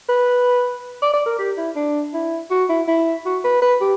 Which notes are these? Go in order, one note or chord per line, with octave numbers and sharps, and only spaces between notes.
B4
D5
D5
A#4
G4
E4
D4
E4
F#4
E4
E4
F#4
B4
B4
G4